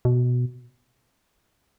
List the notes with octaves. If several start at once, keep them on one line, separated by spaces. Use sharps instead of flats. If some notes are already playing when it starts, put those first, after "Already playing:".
B2